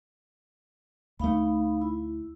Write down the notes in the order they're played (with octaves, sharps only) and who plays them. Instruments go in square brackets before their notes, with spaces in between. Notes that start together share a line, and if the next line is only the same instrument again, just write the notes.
[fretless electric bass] D2 A3 [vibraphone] D#4 F5 B5
[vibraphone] E4